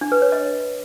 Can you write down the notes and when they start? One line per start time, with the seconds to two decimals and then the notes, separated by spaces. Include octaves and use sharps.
0.01 D4
0.12 B4
0.22 C#5
0.32 D#5